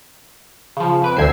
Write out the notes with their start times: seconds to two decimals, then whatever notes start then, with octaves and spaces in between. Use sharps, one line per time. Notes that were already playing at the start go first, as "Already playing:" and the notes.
0.77 C#3 F3
1.02 F2 B4 D7
1.17 D2 C5 E6 G#6 C7